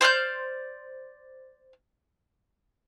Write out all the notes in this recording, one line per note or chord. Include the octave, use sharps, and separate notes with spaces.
C5 D5 F6 G6